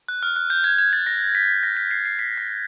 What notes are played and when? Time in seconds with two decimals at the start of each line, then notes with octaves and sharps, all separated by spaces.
0.08 F#6
0.23 F6
0.36 F#6
0.50 G6
0.64 G#6
0.78 G#6
0.93 A6
1.06 A#6
1.35 B6
1.63 A#6
1.77 B6
1.91 C7
2.06 C7
2.19 B6
2.38 A#6